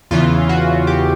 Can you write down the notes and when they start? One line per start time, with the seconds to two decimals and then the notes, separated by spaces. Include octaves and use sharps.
0.11 E2 C#3 E3 F4
0.49 F#4
0.87 G4